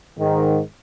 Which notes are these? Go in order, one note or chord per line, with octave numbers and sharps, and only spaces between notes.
G#2 D#3